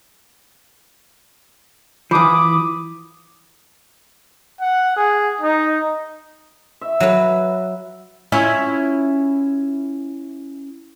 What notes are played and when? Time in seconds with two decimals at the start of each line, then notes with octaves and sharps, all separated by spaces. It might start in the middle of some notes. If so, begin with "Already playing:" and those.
2.11 E3 F3 B5 D6 D#6
4.61 F#5
4.96 G#4
5.41 D#4
6.81 E5
7.00 F#3 B4
8.32 C#4 E4 F4